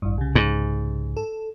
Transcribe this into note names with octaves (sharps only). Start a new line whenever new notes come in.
A1 G2
C2 C#3
G#2
A4